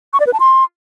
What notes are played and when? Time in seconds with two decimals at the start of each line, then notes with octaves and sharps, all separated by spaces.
0.13 C#6
0.20 D5
0.27 B4
0.33 A5
0.40 C6